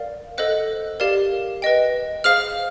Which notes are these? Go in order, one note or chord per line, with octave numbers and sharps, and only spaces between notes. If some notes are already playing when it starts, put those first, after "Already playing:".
Already playing: A#4 D5 F5
A4 C5 D#5 F#5 F#6
G4 A#4 D5 F5
B4 D#5 G5
G#4 C5 F5 F6